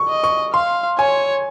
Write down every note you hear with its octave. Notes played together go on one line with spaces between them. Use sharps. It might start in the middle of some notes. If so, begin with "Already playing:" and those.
Already playing: C#6
D#5
C#6
F5 C6
C#5 G#5